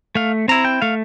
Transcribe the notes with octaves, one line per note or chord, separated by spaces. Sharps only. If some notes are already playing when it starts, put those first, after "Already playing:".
A3 F5
C4 E4 A#5
G5
A3 F5